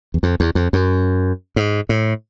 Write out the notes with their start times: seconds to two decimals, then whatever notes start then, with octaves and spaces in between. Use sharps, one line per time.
0.14 E2
0.23 F2
0.40 E2
0.55 F2
0.73 F#2
1.56 G#2
1.89 A2